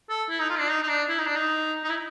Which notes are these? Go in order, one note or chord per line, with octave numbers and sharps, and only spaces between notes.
A4
E4
D#4
F4
D4
D#4
D#4
D4
E4
D#4
D4
D#4
D#4
E4